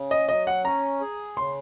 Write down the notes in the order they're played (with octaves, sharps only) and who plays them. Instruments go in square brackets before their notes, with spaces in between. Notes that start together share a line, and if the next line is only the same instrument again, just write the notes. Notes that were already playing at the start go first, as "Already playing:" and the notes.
Already playing: [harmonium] C#3
[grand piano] D#5
[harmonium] F#3 [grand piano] D#5
[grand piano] F#5
[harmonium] C#4 [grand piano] A#5
[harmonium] G#4
[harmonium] C#3 [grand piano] C6